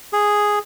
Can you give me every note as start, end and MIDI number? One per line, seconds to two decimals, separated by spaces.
0.13 0.59 68